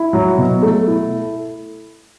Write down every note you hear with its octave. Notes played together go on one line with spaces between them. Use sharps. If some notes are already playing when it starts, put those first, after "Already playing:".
Already playing: E4
F#3
B2
A3
E4